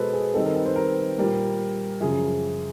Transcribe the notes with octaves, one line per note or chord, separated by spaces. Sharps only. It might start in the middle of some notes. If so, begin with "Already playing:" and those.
Already playing: B2 G#3 B3 G#4 A4 B4 C5
G#4
D#3 G3 C4 D#4 A4
A#4
B4
C5
A#4
A#2 G3 A#3
F#2 C#3 F3 G#4